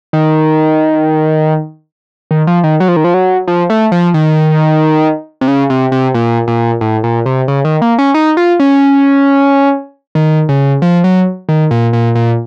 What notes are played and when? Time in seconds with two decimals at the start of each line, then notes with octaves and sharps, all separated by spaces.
0.13 D#3
2.31 D#3
2.47 F3
2.64 D#3
2.80 F#3
2.88 F3
2.97 D#3
3.04 F3
3.14 F#3
3.48 F3
3.70 A3
3.92 F3
4.14 D#3
5.41 C3
5.48 C#3
5.70 C3
5.92 C3
6.14 A#2
6.48 A#2
6.81 A2
7.04 A#2
7.26 C3
7.48 C#3
7.65 D#3
7.82 A#3
7.98 C#4
8.14 D#4
8.37 F4
8.60 C#4
10.15 D#3
10.49 C#3
10.82 F3
11.04 F#3
11.49 D#3
11.71 A#2
11.93 A#2
12.15 A#2